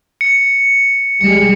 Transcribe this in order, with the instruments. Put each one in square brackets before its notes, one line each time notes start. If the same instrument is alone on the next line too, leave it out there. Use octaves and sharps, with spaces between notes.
[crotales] C#7
[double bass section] G3 G#3 [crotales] C#7